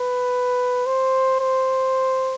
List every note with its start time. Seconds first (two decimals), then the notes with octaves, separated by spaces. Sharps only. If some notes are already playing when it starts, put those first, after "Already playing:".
Already playing: B4
0.86 C5
1.40 C5